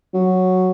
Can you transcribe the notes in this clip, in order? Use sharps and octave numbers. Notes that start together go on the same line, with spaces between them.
F#3